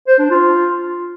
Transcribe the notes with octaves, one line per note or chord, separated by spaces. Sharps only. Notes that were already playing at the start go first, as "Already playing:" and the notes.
C5
D4
F4